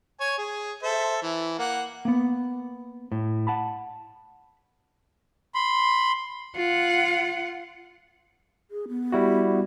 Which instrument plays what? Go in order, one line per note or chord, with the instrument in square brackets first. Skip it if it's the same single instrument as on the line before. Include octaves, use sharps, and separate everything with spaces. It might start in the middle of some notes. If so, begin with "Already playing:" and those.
[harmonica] C#5 G#5
G#4
A4 C5 E5
E3
A#3 F#5
[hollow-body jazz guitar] A#3 B3
A2
F#5 A5 B5
[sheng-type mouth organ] B5 C6
[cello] F4 F#5
[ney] G#4
B3
[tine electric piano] G3 E4 F#4